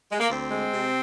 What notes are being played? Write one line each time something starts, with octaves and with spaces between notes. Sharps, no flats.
G#3
A#3
D2 C4
G#3
C3